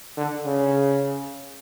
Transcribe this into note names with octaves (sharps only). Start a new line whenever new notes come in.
D3
C#3